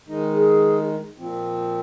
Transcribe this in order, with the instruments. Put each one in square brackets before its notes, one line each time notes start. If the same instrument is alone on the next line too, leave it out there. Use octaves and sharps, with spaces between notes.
[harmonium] D#3 G#3 D#4
[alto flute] G#4
[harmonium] A#2 F3 C4